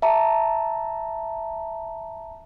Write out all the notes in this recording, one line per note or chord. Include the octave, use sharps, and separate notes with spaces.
E5 A5 A#5